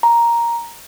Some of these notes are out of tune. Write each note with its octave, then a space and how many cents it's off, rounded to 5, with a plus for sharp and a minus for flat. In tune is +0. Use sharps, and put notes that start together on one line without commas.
A#5 +5